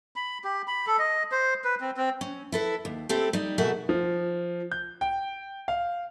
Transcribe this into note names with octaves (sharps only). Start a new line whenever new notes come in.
B5
G4
B5
A4
D#5
C5
B4
C4
C4
C#4
E4 A4 B4
D#2
A3 C4 E4 G4 A4
G3 D#4
B2 A3 F#4 G#4 A#4 E5
F3
G6
G5
F5